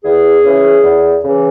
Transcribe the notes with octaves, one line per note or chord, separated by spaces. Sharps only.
E2 G#4
C#3 E3
E2
C#3 E3